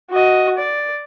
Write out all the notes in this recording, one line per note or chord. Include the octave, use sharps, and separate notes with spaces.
F#4 D#5
D5